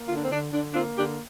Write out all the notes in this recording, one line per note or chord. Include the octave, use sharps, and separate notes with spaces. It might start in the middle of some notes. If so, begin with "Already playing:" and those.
Already playing: A#3
D3 F4
D4
C4
D3 D4
D3 D4
D4
A#3 C4 F4
D3 D4 G4